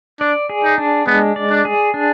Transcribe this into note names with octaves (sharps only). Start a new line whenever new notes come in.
D4 D5
G#4
D#4
D4
G#3 B3
D5
D4
G#4
D4